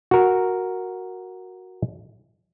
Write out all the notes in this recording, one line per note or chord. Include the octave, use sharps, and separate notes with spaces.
F#4 A#4